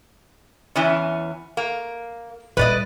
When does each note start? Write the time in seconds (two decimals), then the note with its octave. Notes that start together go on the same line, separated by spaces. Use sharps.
0.76 E2 E3 C#4
1.57 A#3
2.57 A#2 G3 B4 D5 D#5